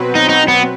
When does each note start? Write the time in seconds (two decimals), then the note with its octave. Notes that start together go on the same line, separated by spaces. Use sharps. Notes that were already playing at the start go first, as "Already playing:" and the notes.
Already playing: B2 F#3 C4 F#4 B4
0.15 D#4
0.29 D#4
0.48 B3